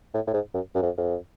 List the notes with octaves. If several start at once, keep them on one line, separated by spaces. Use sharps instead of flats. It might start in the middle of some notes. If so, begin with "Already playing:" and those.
A2
A2
G#2
F#2
F#2
F2
F2